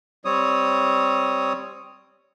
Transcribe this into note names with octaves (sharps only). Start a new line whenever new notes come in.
G3 C4 C#5 D#6